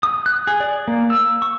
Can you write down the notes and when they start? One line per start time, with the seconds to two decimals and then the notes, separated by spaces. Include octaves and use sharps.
0.03 D#6
0.26 F#6
0.47 G#4
0.60 D5
0.88 A#3
1.10 E6
1.42 C#6